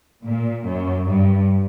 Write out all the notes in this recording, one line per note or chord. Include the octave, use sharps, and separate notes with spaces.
A#2
F#2
G2